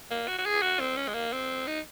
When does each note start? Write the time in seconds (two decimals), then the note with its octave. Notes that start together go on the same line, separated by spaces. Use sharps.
0.11 A#3
0.28 F#4
0.38 F#4
0.46 G#4
0.62 F#4
0.80 C4
0.97 C#4
1.08 G#3
1.14 A#3
1.33 C4
1.67 D#4